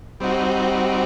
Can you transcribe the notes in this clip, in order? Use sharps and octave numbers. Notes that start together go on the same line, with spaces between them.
G3 C4 D#4 F#4